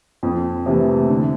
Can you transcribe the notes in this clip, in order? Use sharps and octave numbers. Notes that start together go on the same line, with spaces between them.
F2
C3 E3 A3
D3